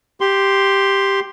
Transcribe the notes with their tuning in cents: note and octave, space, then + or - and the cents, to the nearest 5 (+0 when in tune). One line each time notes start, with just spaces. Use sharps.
G4 +0 C6 +0